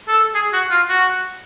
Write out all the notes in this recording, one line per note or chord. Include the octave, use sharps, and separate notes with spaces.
A4
G#4
F#4
F4
F#4